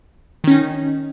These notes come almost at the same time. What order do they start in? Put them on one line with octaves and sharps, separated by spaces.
D#3 C#4 D#4